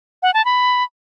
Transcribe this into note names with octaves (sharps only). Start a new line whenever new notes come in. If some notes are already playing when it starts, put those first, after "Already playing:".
F#5
A5
B5